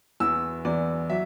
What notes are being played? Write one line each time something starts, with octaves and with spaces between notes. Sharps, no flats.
E2 E3 E6
E2 E3 D5
F#3 E5